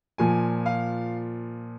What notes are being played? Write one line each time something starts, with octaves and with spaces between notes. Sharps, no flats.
A#2 F3 G#5
F5